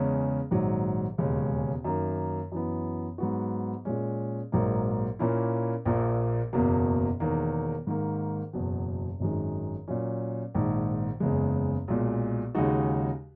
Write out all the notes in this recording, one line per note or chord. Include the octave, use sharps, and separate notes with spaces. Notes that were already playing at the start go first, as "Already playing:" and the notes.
Already playing: E2 C#3 G#3 C#4
A#1 G#2 D#3 F#3
E1 D#2 C#3 G#3 C#4
F#2 D#3 A#3
F#2 E3 B3
G#2 F#3 B3 F#4
A#2 G#3 C#4
A#1 G#2 F#3 A#3
A#2 A#3 C#4 E4
A#1 A#2 A#3
F#1 E2 B2 A#3
E1 E2 D#3 A#3
G#2 D#3 A#3
F#1 E2 B2 F#3
G#1 F#2 D#3 G#3
A#2 F#3 C#4
A#1 G#2 D#3
F#1 E2 C#3 G#3
B1 A#2 G#3
D#2 C#3 G#3 D#4 F#4